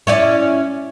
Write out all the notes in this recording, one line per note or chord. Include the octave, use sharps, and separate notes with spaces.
C#4 E4 D5